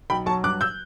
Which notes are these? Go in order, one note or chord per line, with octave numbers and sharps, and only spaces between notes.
B1 G5 B5
F#3 A5 C#6
G2 D6 F#6
E6 G6